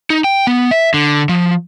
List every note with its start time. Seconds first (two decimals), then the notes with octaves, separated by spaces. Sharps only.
0.10 D#4
0.24 G5
0.47 B3
0.71 E5
0.94 D3
1.29 F3